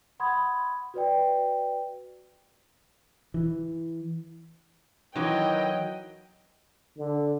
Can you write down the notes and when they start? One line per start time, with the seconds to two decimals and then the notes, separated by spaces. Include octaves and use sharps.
0.20 F#5 B5 C6 D#6 G#6
0.94 F#4 B4 D5 G5
3.34 E3
5.15 D#3 E3 F#3 D#5 G5
6.98 D3